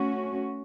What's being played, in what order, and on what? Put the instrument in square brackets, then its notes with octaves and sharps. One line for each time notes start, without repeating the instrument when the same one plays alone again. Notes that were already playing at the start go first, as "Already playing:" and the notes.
Already playing: [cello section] A3 C#4 F#4